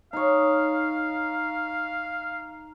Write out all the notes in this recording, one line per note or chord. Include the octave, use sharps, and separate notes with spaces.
D#4 C#5 F5